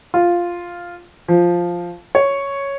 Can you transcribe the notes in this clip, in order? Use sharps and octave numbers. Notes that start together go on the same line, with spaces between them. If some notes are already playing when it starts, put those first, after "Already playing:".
F4
F3
C#5